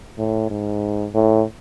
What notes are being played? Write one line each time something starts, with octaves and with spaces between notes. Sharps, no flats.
A2
G#2
A2